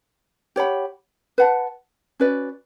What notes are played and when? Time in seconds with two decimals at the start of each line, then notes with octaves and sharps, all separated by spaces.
0.56 G4 C#5 F#5 B5
1.38 B4 F#5 A5
2.20 C#4 F#4 B4 D5